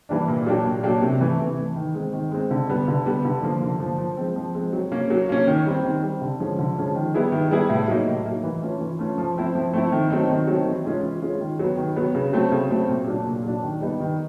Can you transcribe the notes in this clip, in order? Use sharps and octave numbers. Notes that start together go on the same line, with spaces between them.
E3 G3 A#3 D4
A#2
F#3 A#3 D4 G4
A#2
F#3 A#3 D4 G4
C3
E3 A3
C3
E3 A3
D#3
G#3 C4
D#3
G#3 C4
D3
G3 B3
D3
G3 B3
D3
F3 A#3
D3
F3 A#3
F3
G#3 C4
F3
G#3 C4
F#3
A#3 C#4
F#3
A#3 C#4
D#3
G3 C4
D#3
G3 C4
D3
F3 G#3 C#4 F4
D3
F3 G#3 C#4 F4
D#3
G3 B3 E4 G#4
D#3
G3 B3 E4 G#4
A2
F#3 A#3 D#4
A2
F#3 A#3 D#4
E3
A3 C#4 F4
E3
A3 C#4 F4
F3
A3 C4 E4
F3
A3 C4 E4
D#3
F#3 A3 C4 D#4
D#3
F#3 A3 C4 D#4
E3
G#3 C#4 F4 G#4
E3
G#3 C#4 F4 G#4
D#3
F#3 B3
D#3
F#3 B3
C#3
F#3 A3 C4
C#3
F#3 A3 C4
A#2
F#3 A#3 D4
A#2
F#3 A#3 D4
D#3
G3 B3 D#4
D#3